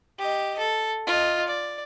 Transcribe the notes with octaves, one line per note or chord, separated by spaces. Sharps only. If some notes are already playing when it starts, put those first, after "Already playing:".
G4 D#5
A4
F4 D#5
D5